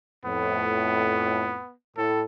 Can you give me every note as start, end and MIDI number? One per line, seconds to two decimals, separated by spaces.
0.25 1.61 41
0.25 1.61 45
0.25 1.73 59
1.97 2.23 45
1.97 2.23 69